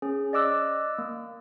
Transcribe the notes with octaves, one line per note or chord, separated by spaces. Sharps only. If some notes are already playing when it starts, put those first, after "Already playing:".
C#4 G#4
D5 D#5 D6 E6 F#6
A#3